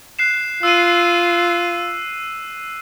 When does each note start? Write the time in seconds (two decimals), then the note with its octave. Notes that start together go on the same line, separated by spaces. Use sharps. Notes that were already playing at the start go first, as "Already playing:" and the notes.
0.19 F#6 C7 E7
0.63 F4 E6 D#7